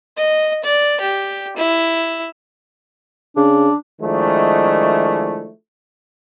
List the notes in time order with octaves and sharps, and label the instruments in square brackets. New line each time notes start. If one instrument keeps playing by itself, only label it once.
[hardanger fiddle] D#5
D5
G4
E4
[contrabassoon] C#3 [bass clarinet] D4
[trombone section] D#3 F3 G#3 A3 D4 E4